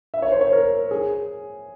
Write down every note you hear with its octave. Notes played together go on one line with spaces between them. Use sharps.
E5
C#5
C5
C#5
A#4
G#4